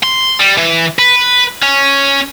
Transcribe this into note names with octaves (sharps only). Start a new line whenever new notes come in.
C6
G3
E3
B4
C#4